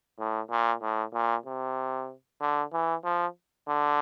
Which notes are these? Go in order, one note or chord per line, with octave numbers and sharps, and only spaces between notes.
A2
A#2
A2
A#2
C3
D3
E3
F3
D3